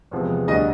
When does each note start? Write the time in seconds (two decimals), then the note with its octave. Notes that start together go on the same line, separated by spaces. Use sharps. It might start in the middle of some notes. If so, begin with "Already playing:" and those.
0.11 E2 C3 F3 G#3 B3
0.47 D2 D3 G3 D#5